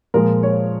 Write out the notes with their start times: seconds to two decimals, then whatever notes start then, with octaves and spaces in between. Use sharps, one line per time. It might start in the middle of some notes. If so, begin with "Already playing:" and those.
0.14 A#2 F3 G#3 A#4
0.43 C#5